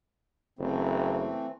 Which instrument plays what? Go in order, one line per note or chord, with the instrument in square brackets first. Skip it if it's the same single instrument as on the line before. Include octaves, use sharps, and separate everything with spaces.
[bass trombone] F#1 [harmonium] E3 A3 C4